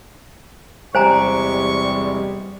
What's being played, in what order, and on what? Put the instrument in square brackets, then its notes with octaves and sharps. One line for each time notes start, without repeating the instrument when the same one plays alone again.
[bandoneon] E2 C3 G#3 [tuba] G3 [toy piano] C5 G#5 A#5 [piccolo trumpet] C#6